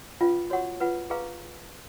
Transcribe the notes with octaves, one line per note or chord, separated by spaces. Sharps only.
C#4 F4 B4 F5
F#4 C#5 F#5 C#6
F4 B4 F#5
G#4 B4 F5 A#5 C#6